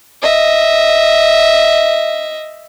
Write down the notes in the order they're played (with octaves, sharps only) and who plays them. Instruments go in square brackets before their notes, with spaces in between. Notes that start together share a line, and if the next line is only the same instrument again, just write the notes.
[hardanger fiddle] D#5 E5